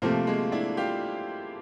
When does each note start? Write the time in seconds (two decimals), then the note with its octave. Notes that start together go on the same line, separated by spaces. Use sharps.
0.02 C3 F3 A3 A#3 C4
0.27 G#3 A#3
0.52 D4 E4
0.77 F4 G4